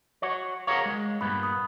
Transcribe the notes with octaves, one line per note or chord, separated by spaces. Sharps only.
F#4 C#5
G#4 A#4 C#5 F5 F#5
G#3
G2 A#2 B3 B5
D#6